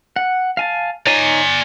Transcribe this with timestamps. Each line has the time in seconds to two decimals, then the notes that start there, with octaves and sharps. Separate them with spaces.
0.16 F#5
0.57 F5 G#5 A5
1.07 D#4 C#5 D5 G#5 A#5